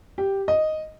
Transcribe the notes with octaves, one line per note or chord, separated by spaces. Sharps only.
G4
D#5